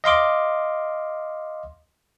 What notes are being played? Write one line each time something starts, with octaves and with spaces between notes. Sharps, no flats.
D#5 F5 C6 D6